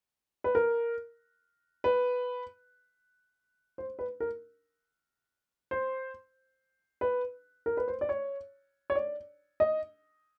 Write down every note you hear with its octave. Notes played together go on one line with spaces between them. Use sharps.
B4
A#4
B4
C5
B4
A#4
C5
B4
A#4
B4
C5
D5
C#5
C#5
D5
D#5